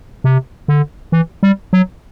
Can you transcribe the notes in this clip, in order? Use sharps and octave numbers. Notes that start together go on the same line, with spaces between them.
C3
D3
E3
G3
F#3